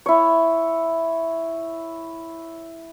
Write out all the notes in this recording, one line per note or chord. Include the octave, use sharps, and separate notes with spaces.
E4 C#5